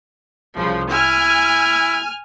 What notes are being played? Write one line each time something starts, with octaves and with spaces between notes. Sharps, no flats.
C2 C#3 F3
E4 G#5 F6